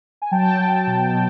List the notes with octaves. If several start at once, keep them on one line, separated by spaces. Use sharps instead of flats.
G#5
F#3 G5 A5
F#3
B2
B2